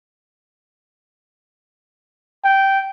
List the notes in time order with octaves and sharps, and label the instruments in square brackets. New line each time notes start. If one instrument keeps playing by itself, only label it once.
[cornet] G5